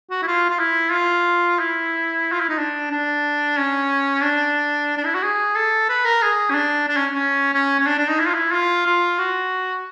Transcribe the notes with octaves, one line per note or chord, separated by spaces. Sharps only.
F#4
E4
F4
F4
E4
F4
E4
F4
E4
D#4
D4
D4
C#4
D4
D4
E4
F#4
G#4
A4
B4
A#4
G#4
C#4
D4
D4
C#4
C#4
C#4
C#4
D4
D4
D#4
E4
F4
E4
F4
F4
F#4